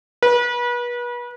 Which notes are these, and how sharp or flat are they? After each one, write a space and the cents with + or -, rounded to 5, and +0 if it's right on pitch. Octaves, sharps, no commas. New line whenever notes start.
B4 -35